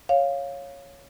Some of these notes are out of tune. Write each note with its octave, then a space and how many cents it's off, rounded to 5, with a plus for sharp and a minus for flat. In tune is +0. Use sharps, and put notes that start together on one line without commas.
C#5 +0 F5 +0